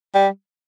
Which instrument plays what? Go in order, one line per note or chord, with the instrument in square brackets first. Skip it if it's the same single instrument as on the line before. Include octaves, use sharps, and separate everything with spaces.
[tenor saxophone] G3